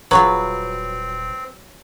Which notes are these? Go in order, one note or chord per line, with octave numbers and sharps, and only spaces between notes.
D#1 F#3 C4 F4 G#4 B4